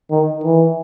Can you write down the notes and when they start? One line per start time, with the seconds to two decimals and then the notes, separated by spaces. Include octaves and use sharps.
0.11 D#3
0.44 E3